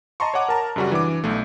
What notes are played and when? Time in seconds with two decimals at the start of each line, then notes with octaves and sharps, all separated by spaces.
0.20 D#5 A5 A#5 C6 C#6
0.34 C#5 D#5 F#5 D6
0.49 A#4 A5 A#5
0.76 F#2 C#3 G3 C#4 F#4
0.92 E3 D4 D6
1.24 B1 A3